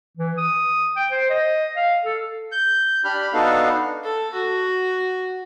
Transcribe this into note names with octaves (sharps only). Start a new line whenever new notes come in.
E3
D#6
G5
C5
D#5
F5
A4
G6
D4 G4 B5 F6
B3 D4 D#4 F#4 A4 F5
A4
F#4